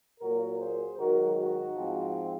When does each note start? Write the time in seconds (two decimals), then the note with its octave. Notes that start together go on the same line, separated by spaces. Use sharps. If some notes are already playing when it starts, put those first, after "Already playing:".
0.20 A#2 F#3 A#3 F#4 A#4
0.59 G#4 C5
0.98 G#2 D#3 F#3 F#4 A#4
1.37 D#4 F#4
1.76 G#2 F3 C4